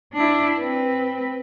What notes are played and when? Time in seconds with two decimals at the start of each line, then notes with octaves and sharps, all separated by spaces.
0.13 D4 E4
0.58 C4 B4